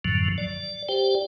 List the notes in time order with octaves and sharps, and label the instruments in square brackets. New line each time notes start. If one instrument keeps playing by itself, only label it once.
[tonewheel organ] F#2 A2 D3 F3 F#3
D5
G4 C5 D5 G5